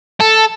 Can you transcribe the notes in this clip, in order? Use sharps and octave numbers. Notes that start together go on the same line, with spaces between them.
A4